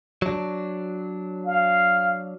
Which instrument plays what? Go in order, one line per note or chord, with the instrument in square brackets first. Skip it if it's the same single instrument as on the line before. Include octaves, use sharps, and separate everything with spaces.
[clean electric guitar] F#3 D4
[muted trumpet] F5